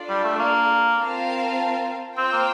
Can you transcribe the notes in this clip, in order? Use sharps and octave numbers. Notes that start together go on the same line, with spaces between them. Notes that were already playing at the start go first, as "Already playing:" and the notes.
Already playing: D4 F4 A4 D5
G3
A3
A#3
C4 F4 A#4 F5 A5
C4 F4 C5 G5
A#3